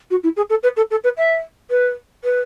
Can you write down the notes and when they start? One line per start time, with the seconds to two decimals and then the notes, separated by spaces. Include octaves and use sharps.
0.10 F#4
0.23 E4
0.36 G#4
0.50 A4
0.63 B4
0.76 A4
0.90 A4
1.04 B4
1.17 E5
1.70 B4
2.24 B4